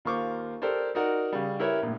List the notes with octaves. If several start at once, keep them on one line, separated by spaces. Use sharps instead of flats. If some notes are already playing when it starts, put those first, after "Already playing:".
D#2 F4 A#4 C5 C#6 D6
G4 A4 A#4 C5 D5
D#4 F#4 A#4 D5 F#5
C#3 G3
E4 G4 A#4 B4 C#5 E5
A#1 A2